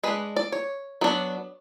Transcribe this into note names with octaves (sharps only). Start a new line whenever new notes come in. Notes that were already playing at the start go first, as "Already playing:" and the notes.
G#3 D4 B4
D5
C#5
F#3 B3 D4